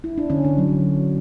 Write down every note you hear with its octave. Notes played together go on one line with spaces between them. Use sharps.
E4
D4
D3 C#4
D3
F#3